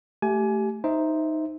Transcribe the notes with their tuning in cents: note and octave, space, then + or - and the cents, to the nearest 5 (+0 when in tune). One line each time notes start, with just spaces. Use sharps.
A3 +0 G4 -10 G#5 +25
D#4 +0 C5 +0 E5 -10